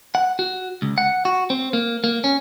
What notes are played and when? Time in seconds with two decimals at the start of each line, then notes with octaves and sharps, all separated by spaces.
0.15 F#5
0.39 F#4
0.82 C#2
0.98 F#5
1.25 F#4
1.50 C4
1.73 A#3
2.04 A#3
2.24 C#4